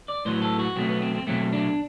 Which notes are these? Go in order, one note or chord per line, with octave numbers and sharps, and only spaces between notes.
D5
A2 F#3 B3 C5
A4
F#4
B2 F#3 A3 C4
B3
C4
C4
B2 F#3 A3 C4
D4